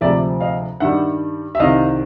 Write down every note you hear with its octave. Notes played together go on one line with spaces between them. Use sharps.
D2 C3 F3 G#3 D5 E5
D#5 F5
G2 D#3 G3 E5 F#5
E5
C2 C3 D#3 D#5 F5